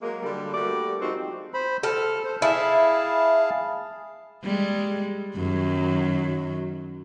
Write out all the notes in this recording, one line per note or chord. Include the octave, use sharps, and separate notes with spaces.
F#3 G#3 A#3
D3 G3
G3 A3 A#3 F#4 D5
F3 G#3 C4 D#4 F#4
C5 B5
A4 F6
C5
E4 G#4 F5 A5
G3 G#3
F#2 D#3 F#3